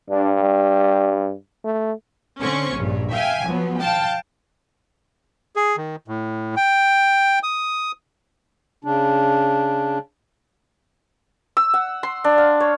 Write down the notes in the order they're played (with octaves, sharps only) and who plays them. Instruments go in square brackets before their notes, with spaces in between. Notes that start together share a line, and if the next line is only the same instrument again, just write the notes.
[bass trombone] G2 [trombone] D4
[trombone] G3
A3
[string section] D3 C4 C#4 C#6
A#1 G2
E5 F5 G5 G#5
F3 F#3 B3
F5 G5 A5
[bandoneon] G#4
D#3
A2
G5
D#6
[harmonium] C#3 D4
[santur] E6
F#5
C6
D4
F5
C#5